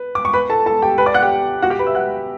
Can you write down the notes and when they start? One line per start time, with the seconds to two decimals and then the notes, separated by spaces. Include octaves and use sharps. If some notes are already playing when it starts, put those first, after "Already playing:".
Already playing: B4
0.15 D6
0.25 C#6
0.33 B4 B5
0.50 A4 A5
0.66 A4 A5
0.82 G4 G5
0.98 B4 B5
1.06 D5 D6
1.14 F#5 F#6
1.22 G4 G5
1.62 F#4 F#5
1.70 G4 G5
1.79 B4 B5
1.87 E5 E6
1.95 F#5 F#6